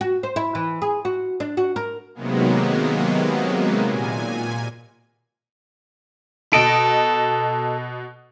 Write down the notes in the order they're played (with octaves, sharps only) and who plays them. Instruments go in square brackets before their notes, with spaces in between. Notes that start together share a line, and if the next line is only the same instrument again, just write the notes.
[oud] F#4
C5
E4
E3
G#4
F#4
D4
F#4
A#4
[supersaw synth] C3 D#3 F#3 G#3 A#3 B3
A#2 G#5
[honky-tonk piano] B2 D#5 D7 [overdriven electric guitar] A4